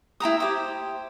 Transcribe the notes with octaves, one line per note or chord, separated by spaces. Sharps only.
E4 G5 A#5 D#6
G4 C5